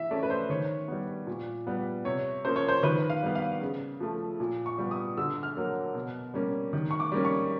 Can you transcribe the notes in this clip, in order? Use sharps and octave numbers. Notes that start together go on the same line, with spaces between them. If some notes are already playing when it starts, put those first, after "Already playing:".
Already playing: E3 E5
A3 C#4 D5
B4
C5
D#3 C#5
G3 B3
A#2
G3 B3
C3 C#5
F3 A#3 C#4 C5
C#5
C5
D#3 B4
F5
G3 B3
F5
C#3
F3 A3
A#2
C#6
G3 B3
D#6
D3 E6
F6
F#3 A#3
B2
G3 A#3 C#4
D#3
C#6
D6
G3 A#3 C#4
C#6